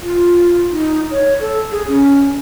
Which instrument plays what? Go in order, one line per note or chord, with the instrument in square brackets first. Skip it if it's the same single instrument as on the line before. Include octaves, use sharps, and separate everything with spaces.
[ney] F4
D#4
C#5
A4
G#4
C#4